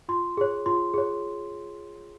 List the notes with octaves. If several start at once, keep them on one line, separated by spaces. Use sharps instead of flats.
F4 C6
G#4 C#5
F4 C6
G#4 C#5